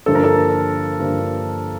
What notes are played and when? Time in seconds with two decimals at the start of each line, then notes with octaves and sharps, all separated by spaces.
0.06 G2 D3 F3 A#3 D4 A4
0.15 A#4
0.24 A4
0.99 G2 D3 F3 A#3 D4